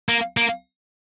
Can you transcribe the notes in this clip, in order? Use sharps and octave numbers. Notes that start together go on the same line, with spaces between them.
A#3
A#3